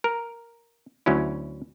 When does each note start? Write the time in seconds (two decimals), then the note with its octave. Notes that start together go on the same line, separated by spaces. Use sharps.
0.04 A#4
1.06 D2 F#3 C#4 E4